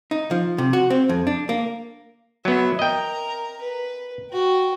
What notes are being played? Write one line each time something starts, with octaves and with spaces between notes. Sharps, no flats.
D#4
F3
C3
F#4
C4
F2
D4
A#3
F#3 B3 E5
A#4 D#5 G5 A#5
B4
F#4 G5